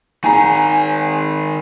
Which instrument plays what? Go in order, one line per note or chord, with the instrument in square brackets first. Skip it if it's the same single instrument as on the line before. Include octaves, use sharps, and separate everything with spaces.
[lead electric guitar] D#3 G#4 [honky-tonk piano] G#5 A#5